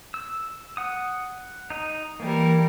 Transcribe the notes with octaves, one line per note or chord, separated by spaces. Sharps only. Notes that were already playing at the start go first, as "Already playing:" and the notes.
E6
F#5 D#6
D#4 D#5
E3 G3 A#3 A#4